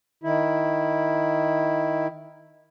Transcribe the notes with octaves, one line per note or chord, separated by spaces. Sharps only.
D#3 E4